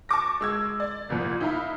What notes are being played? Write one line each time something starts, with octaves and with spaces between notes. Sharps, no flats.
A5 C#6 D6 A#6
G#3 E6 G#6
D5
F#1 C2 A#2 F3
D#4 E4 F5 A#5 B5